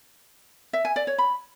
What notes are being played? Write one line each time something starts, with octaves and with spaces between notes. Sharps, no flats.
E5
G#5
D5
C#5
B5